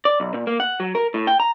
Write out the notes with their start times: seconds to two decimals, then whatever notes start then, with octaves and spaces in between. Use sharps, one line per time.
0.05 D5
0.20 B1
0.34 A#2
0.47 A#3
0.60 F#5
0.80 F#3
0.95 A#4
1.14 A2
1.27 G5
1.40 A#5